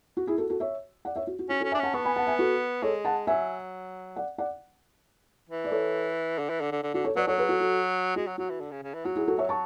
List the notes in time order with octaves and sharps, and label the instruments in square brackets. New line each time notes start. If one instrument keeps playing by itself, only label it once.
[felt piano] F#4
E4 G#4
F#4 A4
F#4 A4
C#5 E5
D5 F#5
C#5 E5
F#4
F#4
[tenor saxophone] C#4 [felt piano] F#4
[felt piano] F#4 A4
[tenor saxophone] C#4
[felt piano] E5 G#5
[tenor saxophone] D4
[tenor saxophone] C#4 [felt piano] F#5 A5
[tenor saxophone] B3 [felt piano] A5 C#6
[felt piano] G#5 B5
F#5 A5
E5 G#5
F#4 A4
[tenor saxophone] G#3 [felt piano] A4 C#5
[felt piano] F#5 A5
[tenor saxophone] F#3 [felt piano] E5 G#5
[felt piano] D5 F#5
D5 F#5
[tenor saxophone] E3
[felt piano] D5
A4 C#5
[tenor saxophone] D3
E3
D3
D3
D3
[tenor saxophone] D3 [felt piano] F#4
[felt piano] A4 C#5
[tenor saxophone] F#3 [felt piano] B4 D5
[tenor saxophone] F#3 [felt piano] A4 C#5
[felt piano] G#4 B4
F#4 A4
F#4 A4
[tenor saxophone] G#3 [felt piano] F#4
[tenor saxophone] F#3
[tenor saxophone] F#3 [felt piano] F#4
[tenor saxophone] E3
D3
C#3
C#3
E3
[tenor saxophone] F#3 [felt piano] F#4
[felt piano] E4 G#4
F#4 A4
C#5 E5
A5 C#6